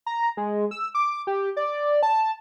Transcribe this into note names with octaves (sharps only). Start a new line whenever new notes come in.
A#5
G#3
E6
D6
G4
D5
A5